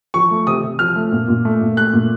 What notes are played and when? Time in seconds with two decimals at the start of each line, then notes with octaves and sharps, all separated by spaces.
0.14 F3 C#6
0.31 A3
0.47 C3 D#6
0.63 C3
0.79 F3 F6
0.96 A3
1.12 A#2
1.28 A#2
1.45 A3
1.61 A#2
1.77 A3 F#6
1.93 A#2